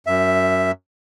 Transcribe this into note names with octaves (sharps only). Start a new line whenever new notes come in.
F#2 E5